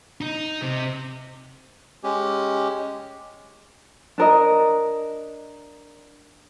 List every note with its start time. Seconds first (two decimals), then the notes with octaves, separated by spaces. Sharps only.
0.21 D#4
0.62 C3
2.04 G#3 C#4 G4
4.18 D4 A#4 D#5